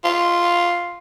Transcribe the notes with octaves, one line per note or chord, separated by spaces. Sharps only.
F4